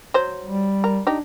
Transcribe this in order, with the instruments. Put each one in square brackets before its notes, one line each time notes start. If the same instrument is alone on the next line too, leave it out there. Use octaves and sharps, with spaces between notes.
[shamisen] F#3 C5
[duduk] G3
[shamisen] A#4
[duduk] D4 [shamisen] D#4 G4